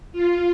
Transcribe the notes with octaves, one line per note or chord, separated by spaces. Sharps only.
F4